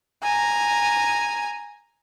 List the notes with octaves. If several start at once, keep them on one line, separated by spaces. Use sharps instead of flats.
G#5 A#5